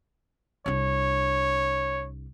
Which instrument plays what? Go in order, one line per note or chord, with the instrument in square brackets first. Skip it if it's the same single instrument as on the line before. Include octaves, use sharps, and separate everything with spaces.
[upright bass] C2 D4 [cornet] C#5